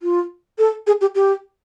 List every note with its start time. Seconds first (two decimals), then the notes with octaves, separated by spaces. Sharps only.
0.03 F4
0.58 A4
0.87 G#4
1.01 G4
1.15 G4